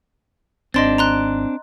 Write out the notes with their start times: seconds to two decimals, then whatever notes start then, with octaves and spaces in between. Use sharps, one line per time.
0.74 G#1 C4 D4 D#5 C6 A6
0.98 A#5 C6 F#6